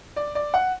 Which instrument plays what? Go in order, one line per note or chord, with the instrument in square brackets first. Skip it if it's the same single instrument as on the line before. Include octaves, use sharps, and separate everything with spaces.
[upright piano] D5
D5
F#5